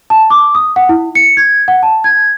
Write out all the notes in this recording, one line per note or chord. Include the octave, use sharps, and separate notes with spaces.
A5
D6
D#6
F#5
E4
C#7
G#6
F#5
A5
G#6